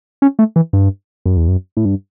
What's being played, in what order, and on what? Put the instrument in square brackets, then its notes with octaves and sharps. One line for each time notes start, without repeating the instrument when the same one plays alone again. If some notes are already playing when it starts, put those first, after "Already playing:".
[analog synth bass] C#4
A3
E3
G2
F#2
E2
F#2
A2
G2